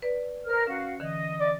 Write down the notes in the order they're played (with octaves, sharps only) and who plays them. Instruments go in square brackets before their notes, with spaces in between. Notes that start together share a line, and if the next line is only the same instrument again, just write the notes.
[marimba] B4 D5
[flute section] A#4 C5 F6
[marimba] C#4 [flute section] F#4 F5
[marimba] D3 E3 [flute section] D#5
[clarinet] D5